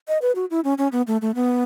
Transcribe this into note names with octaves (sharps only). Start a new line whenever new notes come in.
D#5
B4
F#4
E4
C#4
C#4
B3
A3
A3
B3